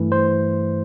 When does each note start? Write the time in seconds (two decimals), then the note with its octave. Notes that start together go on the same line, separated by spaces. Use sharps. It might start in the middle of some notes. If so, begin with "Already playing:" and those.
Already playing: G2 E3 A3
0.12 C5